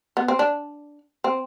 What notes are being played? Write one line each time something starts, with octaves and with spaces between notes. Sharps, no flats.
B3
C4
D4
C4